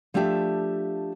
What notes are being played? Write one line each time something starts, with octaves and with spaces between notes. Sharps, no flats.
F3 A3 D4 G4 E5 A5